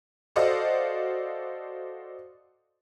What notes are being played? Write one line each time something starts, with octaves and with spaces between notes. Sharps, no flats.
F#4 A4 C5 D5 D#5 F5